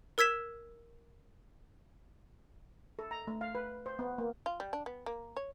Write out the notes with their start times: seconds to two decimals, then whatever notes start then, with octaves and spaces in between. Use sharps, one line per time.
0.18 A#4 E6 G#6 B6 E7
2.99 A4
3.11 A#5
3.27 A3
3.41 F5
3.55 B4
3.86 C5
3.99 B3
4.18 A#3
4.46 F4
4.60 G3
4.73 D4
4.86 B3
5.06 A#3
5.37 C#5